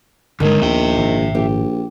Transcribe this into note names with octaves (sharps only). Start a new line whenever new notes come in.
G1 D3 D#3 G#3
A#1 D#2 B3 E5 G5
G#1 A#2
A#1 G4